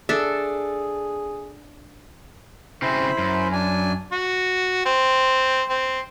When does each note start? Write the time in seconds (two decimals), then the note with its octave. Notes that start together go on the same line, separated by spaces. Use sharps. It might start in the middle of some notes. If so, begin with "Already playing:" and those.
0.09 D4 G#4 A4 E5
2.82 C#3 C4 E4 C5 B5
3.18 F#2
3.52 D4 G#5
4.12 F#4
4.86 C4
5.69 C4